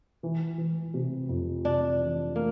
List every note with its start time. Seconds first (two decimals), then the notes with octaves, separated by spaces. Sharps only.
0.23 E3
0.58 E3
0.94 C3
1.29 F2
1.64 C3 D4
1.99 E3
2.36 A3 A#3